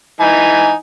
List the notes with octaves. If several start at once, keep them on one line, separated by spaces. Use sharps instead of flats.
E3 D#4 G#5